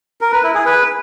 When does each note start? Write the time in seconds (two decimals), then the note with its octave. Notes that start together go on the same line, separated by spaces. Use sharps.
0.21 A#4
0.32 B4
0.43 E4
0.54 G#4
0.65 B4